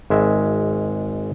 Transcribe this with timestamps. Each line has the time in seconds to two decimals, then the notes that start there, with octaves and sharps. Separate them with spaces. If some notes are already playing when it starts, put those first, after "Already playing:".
0.10 G#1 G#3 E5